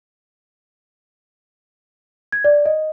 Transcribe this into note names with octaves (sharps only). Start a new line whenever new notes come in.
G#6
D5
D#5